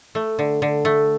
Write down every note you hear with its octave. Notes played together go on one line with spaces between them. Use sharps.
A3
D3
D3
A3